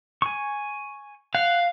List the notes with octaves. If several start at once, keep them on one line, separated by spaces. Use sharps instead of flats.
G#5 C#6
F5 F#5